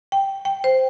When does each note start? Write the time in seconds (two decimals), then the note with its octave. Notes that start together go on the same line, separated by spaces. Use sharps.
0.12 G5
0.45 G5
0.64 C5